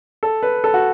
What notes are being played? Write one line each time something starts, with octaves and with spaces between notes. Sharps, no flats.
A4
B4
A4
F#4